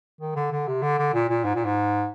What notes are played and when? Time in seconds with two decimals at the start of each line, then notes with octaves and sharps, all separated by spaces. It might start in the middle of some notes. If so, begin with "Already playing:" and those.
0.21 D#3
0.36 D3
0.52 D3
0.67 C3
0.82 D3
0.98 D3
1.13 A#2
1.29 A#2
1.44 G#2
1.55 A#2
1.65 G#2